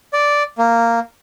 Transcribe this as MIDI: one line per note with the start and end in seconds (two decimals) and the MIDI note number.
0.13 0.43 74
0.58 1.00 58